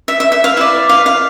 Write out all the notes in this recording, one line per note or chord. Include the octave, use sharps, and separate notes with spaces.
E5
E5
E5
F5
E4 B4 D5 E5
F5
F5